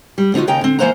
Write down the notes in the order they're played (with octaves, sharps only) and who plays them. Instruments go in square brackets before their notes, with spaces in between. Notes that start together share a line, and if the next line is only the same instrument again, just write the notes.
[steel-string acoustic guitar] G3
D3 C4 D#4 F4 F#4
D#2 C#3 D#4 G5 A#5
D3 C4
E3 F3 A#3 C5 F#5 A#5